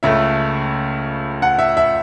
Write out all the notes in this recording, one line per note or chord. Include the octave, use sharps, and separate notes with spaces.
C#2 C#3 A3 E5
F#5
E5
E5